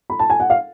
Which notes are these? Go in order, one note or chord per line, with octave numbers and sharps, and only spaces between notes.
B5
A5
G#5
F#5
F5